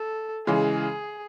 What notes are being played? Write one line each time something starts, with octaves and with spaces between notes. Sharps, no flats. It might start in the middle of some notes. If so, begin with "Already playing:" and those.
Already playing: A4
C#3 E3 G#3 G#4